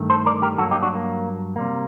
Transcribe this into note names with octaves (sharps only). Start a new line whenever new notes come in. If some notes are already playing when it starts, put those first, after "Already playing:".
Already playing: G2 D#3 A3
A4 C5
A#4 D5
G4 A#4
G2 F#3 A#3 F#4 A4
D#4 G4
D4 F#4
A#3
C3 G3 A#3